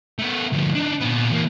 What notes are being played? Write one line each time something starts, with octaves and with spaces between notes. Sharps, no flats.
A3 B3
D2 F3
D4 D#4
A#2 B3
E3 A#3